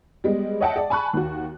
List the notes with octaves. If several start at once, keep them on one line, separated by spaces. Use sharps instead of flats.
G3 G#3 B3
C#5 D#5 E5 F#5 G5 A5
G#4 D5
G#5 A5 B5 C#6 F#6
D#2 F#4